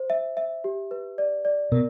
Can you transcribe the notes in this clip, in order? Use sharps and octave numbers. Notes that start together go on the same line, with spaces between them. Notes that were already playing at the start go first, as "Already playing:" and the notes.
Already playing: C5
E5
E5
G4
B4
D5
D5
B2 A#4